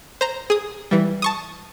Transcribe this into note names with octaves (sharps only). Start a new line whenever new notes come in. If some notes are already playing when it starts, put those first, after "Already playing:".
C5 A#5
G#4 D#6
E3 G3
A5 C#6 D#6